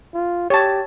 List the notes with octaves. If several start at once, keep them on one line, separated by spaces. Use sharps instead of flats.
F4
G4 C#5 A5